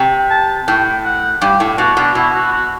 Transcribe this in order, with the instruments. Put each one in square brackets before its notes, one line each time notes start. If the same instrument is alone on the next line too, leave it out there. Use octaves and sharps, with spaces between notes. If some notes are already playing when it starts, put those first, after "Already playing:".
Already playing: [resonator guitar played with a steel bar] C3
[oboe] A5
[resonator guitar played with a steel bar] A2 [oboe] G5
[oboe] F#5
[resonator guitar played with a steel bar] G2 [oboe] G4
[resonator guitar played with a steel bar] A2
[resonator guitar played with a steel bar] B2 [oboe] F#4
[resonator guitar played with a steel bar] B2 [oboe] D4
[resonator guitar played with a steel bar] B2 [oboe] E4
[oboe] F#4
F#4